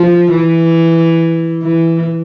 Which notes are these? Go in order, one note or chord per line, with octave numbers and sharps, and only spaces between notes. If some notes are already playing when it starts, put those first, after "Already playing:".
Already playing: F3
E3
E3